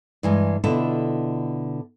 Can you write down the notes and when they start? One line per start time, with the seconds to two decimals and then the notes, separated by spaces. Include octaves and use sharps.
0.23 G2 E3 G#3
0.64 B2 D3 E4 F4 A4